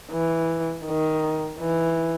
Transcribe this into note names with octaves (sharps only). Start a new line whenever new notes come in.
E3
D#3
E3